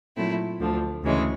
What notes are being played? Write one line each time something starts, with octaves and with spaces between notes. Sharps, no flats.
A#2 F#3 A3 C4 E4
D2 D3 F3
D2 C#3 E3 G#3